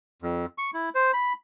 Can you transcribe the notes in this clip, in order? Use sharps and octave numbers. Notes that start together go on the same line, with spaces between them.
F2
C#6
E4
C5
B5